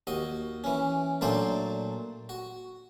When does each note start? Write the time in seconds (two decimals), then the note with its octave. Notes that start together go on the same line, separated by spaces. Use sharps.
0.07 D#2 F#4 D#5
0.64 E3 C#4
1.21 A#2 F#3 A3 D4 C5 D5
2.29 F#4